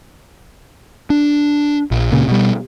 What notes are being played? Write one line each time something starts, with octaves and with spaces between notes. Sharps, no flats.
D4
A#1
C#2 A#2 C#3
B2 G3